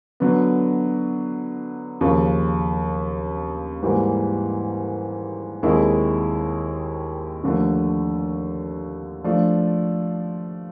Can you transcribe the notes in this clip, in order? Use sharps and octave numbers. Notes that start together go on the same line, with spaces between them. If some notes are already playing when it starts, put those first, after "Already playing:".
D3 F#3 B3
D#2 C#3 F3
G#2 E3 G3 A#3
D#2 D#3 G#3 C4 E4
D#2 D3 F3 A3
F3 A3 D4 F4